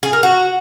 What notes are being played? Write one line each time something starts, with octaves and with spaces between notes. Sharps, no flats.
G#4
A#4
F#4